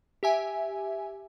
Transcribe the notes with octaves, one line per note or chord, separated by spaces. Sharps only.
G4 E5 G#5